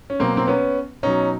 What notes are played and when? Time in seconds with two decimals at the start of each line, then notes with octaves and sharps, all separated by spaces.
0.10 C#4
0.20 B2 F#3 A#3 C4
0.37 C4
0.47 B3 C#4
1.03 B2 F#3 C#4 D#4